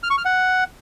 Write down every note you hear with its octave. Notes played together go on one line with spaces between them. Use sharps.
F6
C#6
F6
F#5